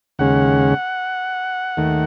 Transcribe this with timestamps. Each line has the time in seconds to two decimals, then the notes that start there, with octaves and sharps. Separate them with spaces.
0.19 D#2 C#3 G#3 C#4 F#5
1.77 D#2 D#3 A3